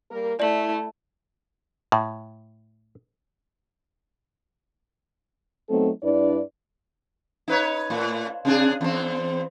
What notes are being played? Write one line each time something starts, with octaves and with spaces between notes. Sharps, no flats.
G3 A#3 A#4
A3 E4 D5 F#7
A2
F#3 A3 B3 C4 D#4 A4
G2 D4 E4 B4 D5
D#4 B4 C#5
A2
C3 D4 G#4
E2 C4